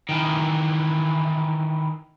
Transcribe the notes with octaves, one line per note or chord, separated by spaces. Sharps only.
D#3 E3